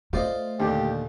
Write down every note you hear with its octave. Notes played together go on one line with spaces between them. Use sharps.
A3 F4 C5 D5 D#5
D#2 A#2 D3 G4